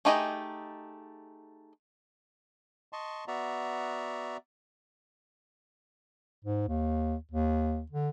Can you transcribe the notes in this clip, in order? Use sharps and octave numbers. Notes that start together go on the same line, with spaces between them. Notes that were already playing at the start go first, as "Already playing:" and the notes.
A3 D#4 G4 G#4 D#5
D#5 A5 C6 C#6
B3 F#4 D5 E5 A#5
G#2
D#2
D#2
D3